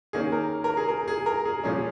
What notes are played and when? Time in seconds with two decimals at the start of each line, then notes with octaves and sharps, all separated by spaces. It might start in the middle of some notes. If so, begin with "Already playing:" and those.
0.13 D#3 A#3 C#4 G#4
0.32 A#4
0.64 A#4
0.77 G#4
0.88 A#4
1.08 G#4
1.26 A#4
1.45 G#4
1.64 A#2 F3 C#4 G#4